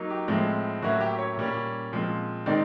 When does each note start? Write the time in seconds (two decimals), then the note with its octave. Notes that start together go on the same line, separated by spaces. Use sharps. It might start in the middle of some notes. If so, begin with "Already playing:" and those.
Already playing: F#3 A#3 D#4
0.10 G4
0.28 A2 F3 G#3 C4
0.82 A2 F#3 A#3 C#4 E4 F#4
1.00 G4
1.18 C#5
1.37 A#2 G3 A#3 C#4
1.92 A#2 F3 G#3 C4
2.46 D#3 G#3 C4 D#4 D5